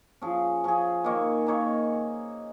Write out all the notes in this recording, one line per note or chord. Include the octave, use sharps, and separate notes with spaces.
F3 C#4 G#4
F3 C#4 G#4
D#3 A#3 D#4 C#5
D#3 A#3 D#4 C#5